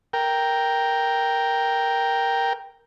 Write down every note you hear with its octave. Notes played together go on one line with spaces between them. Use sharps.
A#4 G5